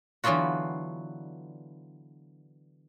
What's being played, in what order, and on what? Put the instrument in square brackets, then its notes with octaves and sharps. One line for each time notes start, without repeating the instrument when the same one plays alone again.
[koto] D3 E3 F#3 B3 F4 F#4